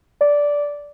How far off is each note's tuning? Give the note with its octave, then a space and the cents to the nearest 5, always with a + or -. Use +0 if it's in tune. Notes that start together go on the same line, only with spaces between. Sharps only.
D5 -10